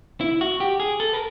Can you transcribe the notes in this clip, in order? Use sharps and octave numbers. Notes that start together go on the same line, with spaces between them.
E4
F#4
G4
G#4
A4
A#4